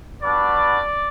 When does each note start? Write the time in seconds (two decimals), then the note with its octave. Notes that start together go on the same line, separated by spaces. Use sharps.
0.22 G3 B3 D4 F#4 D5